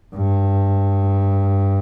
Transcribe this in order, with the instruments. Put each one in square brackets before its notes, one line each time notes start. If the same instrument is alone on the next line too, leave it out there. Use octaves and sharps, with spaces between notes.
[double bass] G2